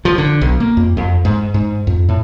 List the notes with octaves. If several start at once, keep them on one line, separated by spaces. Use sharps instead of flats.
F3
D3
B1
A#3
F2
F2
G#2
G#2
F2
A2